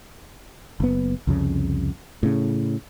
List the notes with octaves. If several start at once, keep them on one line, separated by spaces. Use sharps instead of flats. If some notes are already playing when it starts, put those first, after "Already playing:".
F#1 B3
C2 F2 C#3
A2 C#3